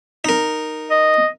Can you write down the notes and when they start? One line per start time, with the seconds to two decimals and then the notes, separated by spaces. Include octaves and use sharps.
0.25 D#4 A#4
0.91 D#5